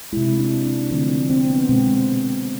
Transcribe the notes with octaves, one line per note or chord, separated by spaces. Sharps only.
C3 G#3 E4
D4
D4
D3 F3 A3 C4
D4
C4
B3
B2 G#3 C4